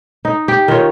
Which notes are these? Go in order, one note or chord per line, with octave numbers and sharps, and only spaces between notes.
D#4
G4
D#3 F4 C#5